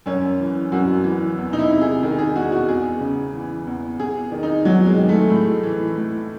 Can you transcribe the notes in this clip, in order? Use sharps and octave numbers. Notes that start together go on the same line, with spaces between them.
F#2 C#4
E3
F#2 F#4
E3
E2
D#4
E4
C3
G#4
D#3 G#4
G#4
E2 F#4
F#4
E2 G#4
C#3
E3
E2
E2 G#4
D#3
D#4
E2 F#3
G#3
D#3
A3
A2
E3
A2